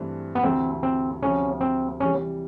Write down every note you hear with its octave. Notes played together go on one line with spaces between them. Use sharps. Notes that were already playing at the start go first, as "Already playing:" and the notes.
Already playing: G2 E3 A3 C4
B3
D2 C3 E3 A3 C4
C4
D2 C3 F3 A3 C#4
C4
C3 E3 G3 C#4